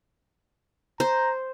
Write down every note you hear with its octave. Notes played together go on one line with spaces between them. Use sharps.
C5 A#5